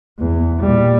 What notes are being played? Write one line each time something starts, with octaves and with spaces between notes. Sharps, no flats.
E2
A#2 G3